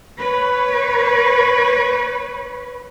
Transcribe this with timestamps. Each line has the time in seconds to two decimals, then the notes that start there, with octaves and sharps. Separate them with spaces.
0.18 B4 C#5